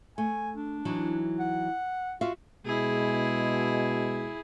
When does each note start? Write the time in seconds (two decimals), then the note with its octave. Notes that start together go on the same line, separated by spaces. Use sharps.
0.18 A3 G#5
0.56 D4
0.85 E3 F#3 D#4
1.40 F#5
2.21 F4 F#4 E5 F5
2.66 B2 G#3 E4 G#4